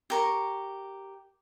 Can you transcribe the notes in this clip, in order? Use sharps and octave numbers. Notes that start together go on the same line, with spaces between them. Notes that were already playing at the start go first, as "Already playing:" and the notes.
G4 A#4 C#6